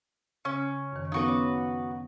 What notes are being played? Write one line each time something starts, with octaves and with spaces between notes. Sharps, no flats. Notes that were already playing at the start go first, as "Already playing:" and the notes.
C#3 C#4
F#2 D#3
F3 B3 C#4 D#4 F#4 B4
C#5 D6